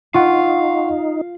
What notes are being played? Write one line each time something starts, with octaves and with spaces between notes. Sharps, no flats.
D#4 F4 F5 F#5 C6 C#6